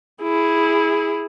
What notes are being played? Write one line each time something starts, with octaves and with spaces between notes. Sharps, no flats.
E4 G#4